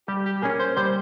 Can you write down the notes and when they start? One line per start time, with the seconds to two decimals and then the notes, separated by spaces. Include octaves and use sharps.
0.08 G3 G4
0.25 G4
0.42 A#3 C#4 G#4
0.59 C5
0.76 G3 C5